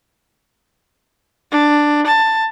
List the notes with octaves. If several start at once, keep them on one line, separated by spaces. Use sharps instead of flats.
D4
A5